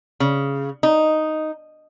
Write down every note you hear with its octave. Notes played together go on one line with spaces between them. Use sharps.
C#3
D#4